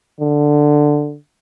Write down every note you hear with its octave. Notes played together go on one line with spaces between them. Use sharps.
D3